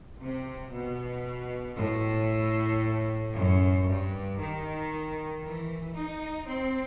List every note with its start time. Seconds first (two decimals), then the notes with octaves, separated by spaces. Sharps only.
0.21 C3
0.74 B2
1.78 A2
3.35 F#2
3.87 G2
4.39 D#3
5.44 E3
5.96 D#4
6.48 C4